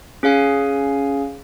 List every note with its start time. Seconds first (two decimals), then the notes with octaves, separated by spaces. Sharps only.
0.23 C#4 G#4 F5 G#5